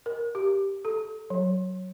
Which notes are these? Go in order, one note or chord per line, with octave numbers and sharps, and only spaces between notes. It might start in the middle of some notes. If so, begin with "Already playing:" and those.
A#4
G4
A4
F#3